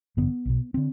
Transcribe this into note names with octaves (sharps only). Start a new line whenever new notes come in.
A1 G2 D3 B3
B1 B2
D3 C4